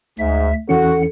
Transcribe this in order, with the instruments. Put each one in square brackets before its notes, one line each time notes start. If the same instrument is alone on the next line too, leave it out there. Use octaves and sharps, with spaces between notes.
[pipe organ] D2 E5 [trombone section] G#2
[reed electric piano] E2 E3 C#4 [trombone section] F#4 [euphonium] A4 [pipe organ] F#5